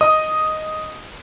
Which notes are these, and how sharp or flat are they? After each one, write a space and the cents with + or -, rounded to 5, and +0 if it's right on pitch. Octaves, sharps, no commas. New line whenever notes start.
D#5 +0 D#6 +0